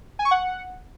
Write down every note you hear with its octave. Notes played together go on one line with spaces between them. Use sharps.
G#5
C#6
F#5